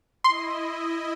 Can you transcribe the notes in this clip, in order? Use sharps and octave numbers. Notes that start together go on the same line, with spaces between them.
E4 D#5 C6